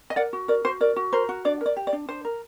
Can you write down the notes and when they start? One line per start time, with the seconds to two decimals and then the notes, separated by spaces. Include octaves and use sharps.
0.10 D#5
0.16 A#4 D5 F#5
0.33 F#4
0.48 A#4 D5
0.65 F#4 C5
0.81 A#4 D5
0.96 F#4
1.13 A#4 C5
1.29 F#4
1.45 D4 D5
1.61 A#4 D5
1.77 G4
1.87 D5
1.93 D4
2.09 D4 C5
2.25 A#4